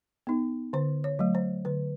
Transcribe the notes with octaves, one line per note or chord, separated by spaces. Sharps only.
B3 D#4
D3 C5
C#5
F#3 A3
C5
D3 B4